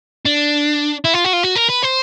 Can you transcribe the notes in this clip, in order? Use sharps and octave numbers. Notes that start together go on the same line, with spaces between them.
D4
E4
F4
F#4
F4
F#4
A#4
B4
C5